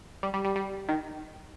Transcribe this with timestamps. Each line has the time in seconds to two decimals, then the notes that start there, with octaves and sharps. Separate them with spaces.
0.23 G3
0.34 G3
0.45 G3
0.56 G3
0.89 D#3